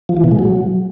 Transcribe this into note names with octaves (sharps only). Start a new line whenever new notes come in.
F3
E3
B2
G#3
F#3